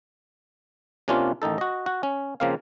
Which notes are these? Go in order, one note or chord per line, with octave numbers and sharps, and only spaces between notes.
C3 A#3 C#4 D4 F4
A1 D#3 D#4 A4
F#4 D#5
F#4
C#4
C#3 F3 A#3 C4 F5